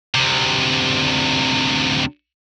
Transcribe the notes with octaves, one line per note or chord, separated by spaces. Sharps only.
D2 C3